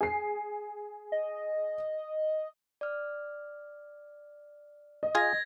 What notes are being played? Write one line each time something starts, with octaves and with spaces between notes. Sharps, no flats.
G#4 C7
D#5
D5 F6
D#5
F4 G#4 G#5 G#6 A#6